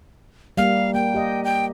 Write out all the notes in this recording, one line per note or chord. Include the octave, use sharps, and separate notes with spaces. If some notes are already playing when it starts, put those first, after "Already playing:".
G3 A#3 F5
A#3 G5
G4 D#5
G5